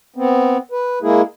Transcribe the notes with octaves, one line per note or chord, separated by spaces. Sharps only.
B3 C4
B4
G#3 A#3 E4 G#4